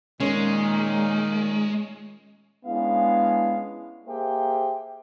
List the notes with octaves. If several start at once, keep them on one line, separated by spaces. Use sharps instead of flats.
A#2 D#3 G#3 C#4
G#3 B3 C#4 D4 E4 F5
A#3 G4 G#4 C5 E5 G5